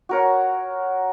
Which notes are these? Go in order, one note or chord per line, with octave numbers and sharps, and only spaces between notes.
F#4 A#4 C#5